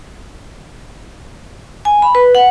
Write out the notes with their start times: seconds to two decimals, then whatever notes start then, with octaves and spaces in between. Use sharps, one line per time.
1.85 G#5
2.02 B5
2.15 B4
2.35 F#5